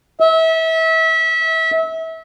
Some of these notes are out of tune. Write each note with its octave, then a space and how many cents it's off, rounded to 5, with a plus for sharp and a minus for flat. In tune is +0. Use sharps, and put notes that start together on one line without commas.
E5 -30